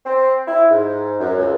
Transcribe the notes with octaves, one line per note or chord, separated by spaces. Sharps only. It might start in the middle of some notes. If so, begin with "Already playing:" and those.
C4
E4
G#2
F#2
C#2